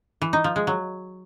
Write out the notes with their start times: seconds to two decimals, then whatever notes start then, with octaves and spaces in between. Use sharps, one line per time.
0.22 E3
0.33 D#4
0.44 F3
0.56 G#3
0.67 F#3